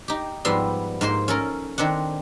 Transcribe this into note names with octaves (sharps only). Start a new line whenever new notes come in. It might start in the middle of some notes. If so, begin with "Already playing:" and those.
D#4 G4
G#2 F3 G3 B3 E5 C6
G#2 A#3 C5 C6
C#4 A4 A#4
D#3 C4 D4 F#5